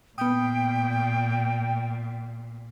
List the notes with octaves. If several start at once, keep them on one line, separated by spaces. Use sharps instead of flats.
A#2 B3 G5 D#6